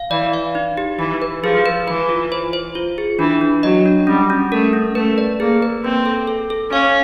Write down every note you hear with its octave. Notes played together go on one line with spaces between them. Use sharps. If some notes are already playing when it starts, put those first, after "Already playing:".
Already playing: F5
E3 D5
F5
D#4
G4
E3 G4
B4
F3 G#4
B4
E3 B4
F4
C5
C5
F4
G#4
E3 D4
D4
F#3 D#5
D4
G3 C#4
C#4
A3 A#4
C#4
A3 B4
D5
A#3 G#4
B4
A#3 C4
A4
A4
A4
C#4 F5